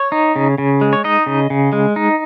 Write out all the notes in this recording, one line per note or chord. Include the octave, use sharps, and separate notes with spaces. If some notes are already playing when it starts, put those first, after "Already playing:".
Already playing: C#5
D#4
C#3
C#3
G#3
C#5
D#4 D#5
C#3
C#3
G#3
D#4